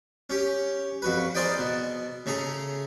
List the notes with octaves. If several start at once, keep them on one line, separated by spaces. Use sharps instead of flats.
C#4 G4
F2 F#4 B4
G#4 A#4 C5 D5 D#5 G5
B2
C#3 A3 G#4 A#5